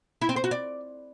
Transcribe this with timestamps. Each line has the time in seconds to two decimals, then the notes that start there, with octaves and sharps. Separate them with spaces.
0.21 E4
0.29 C4
0.36 C5
0.44 F#4
0.51 D5